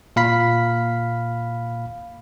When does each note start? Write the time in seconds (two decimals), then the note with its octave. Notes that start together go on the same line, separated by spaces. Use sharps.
0.16 A#2 F5 B5 B6